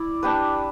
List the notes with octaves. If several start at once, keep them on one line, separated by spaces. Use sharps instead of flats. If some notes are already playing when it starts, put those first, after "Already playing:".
Already playing: E4 D5
D4 G4 B4